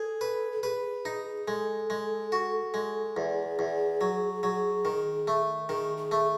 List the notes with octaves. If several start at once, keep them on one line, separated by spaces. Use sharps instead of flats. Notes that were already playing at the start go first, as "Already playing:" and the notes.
Already playing: G#4 A4
B4
A4
G#4 B4
D#4
G#3 A4
G#3
F#4
G#3
E2 G#4
E2
F#3
F#3
D#3
A3
D#3 G#4
G#4
A3